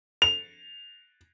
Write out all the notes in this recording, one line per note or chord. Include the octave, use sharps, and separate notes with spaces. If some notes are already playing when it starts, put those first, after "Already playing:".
F7